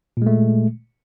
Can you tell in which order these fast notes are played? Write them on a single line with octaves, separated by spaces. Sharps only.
A#2 G#3 A3